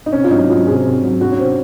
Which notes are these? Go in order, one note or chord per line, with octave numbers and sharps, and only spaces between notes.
D#4
C3 C#4
F4
F#3 D#4
F#3 F4
C3 G#4
C3
F#3
F#3 F#4
C#4
C3 C4